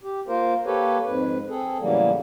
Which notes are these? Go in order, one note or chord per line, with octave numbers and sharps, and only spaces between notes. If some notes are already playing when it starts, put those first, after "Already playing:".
G4
A#3 F4 A#4 C5
A#3 G4 A4 B4 C#5
F2 G#2 B4
C4 G#4 A4
A2 C#3 E3 F#3 G3 A#3